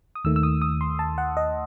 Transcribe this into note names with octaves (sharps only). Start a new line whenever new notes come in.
D#6
D#2 D#3 A3 E6
E6
D#6
D#6
C6
A5
F#5
D#5